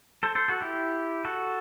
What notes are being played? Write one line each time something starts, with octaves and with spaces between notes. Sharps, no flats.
A4 C5
A4 C5
F#4 A4
E4 G4
F#4 A4